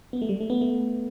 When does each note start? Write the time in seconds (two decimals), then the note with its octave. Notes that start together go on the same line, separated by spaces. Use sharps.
0.13 B3
0.22 A3
0.29 G3
0.41 A3
0.50 B3
0.61 A3